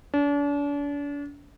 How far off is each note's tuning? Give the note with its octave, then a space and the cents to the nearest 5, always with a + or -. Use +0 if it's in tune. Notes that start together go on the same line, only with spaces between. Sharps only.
D4 -40